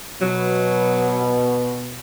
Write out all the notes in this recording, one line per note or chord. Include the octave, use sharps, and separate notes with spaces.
B2 F#3